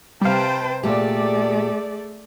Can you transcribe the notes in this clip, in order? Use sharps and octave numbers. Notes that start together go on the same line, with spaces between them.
C3 G3 B4 C5 F5 G5 A5
A#2 A3 G4 G#4 D5